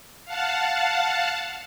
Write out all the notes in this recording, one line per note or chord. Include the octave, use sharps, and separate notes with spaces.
F5 F#5 A5